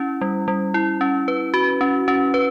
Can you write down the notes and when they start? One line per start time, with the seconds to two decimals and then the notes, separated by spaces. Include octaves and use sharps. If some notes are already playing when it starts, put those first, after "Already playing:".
Already playing: C#4 E4
0.21 G3
0.48 G3
0.74 E4
1.01 C#4
1.28 B4
1.54 F#4
1.81 C#4
2.08 C#4
2.34 B4